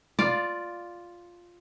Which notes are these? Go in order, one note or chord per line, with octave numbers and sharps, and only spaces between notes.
F4 D5